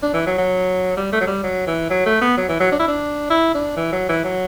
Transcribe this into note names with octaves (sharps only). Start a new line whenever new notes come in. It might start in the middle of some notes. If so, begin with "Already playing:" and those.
D4
E3
F#3
F#3
G3
A3
F#3
G3
F#3
E3
F#3
A3
B3
F#3
E3
F#3
D4
E4
D4
E4
D4
E3
F#3
E3
F#3